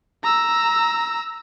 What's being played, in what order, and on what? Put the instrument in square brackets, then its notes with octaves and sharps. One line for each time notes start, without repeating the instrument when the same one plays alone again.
[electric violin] A#5 E6